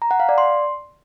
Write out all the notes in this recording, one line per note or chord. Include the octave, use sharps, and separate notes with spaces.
A#5
F#5
F5
D5
C6